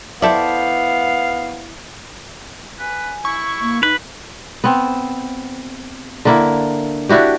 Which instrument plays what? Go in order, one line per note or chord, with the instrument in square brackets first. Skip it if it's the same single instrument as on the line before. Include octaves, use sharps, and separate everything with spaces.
[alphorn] B3 [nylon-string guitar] E4 C5 E5 [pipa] A4 D5 [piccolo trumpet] F5
[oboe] B4 [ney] G#5
[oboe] E4 [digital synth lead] C#6
[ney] A#3
[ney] D#4 [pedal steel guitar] B4
[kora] B3 C4
D3 A#3 E4
D4 E4 F#4 G4